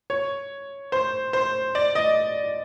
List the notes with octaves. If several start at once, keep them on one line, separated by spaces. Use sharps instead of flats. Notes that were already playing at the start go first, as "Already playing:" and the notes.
C#5
C5
C5
D5
D#5